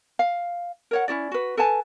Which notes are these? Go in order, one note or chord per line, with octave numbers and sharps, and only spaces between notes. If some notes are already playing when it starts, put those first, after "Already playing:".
F5
A#4 C#5 F#5
C#4 E4 F#4 D5
F#4 B4
A4 B4 G#5 A5